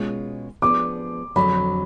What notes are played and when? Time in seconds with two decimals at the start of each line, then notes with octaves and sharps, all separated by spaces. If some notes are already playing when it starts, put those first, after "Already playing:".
Already playing: B2 G#3 C#4 F4 G#4
0.62 F3 B3 D4 G#4 D6
1.36 F2 D3 F#3 B5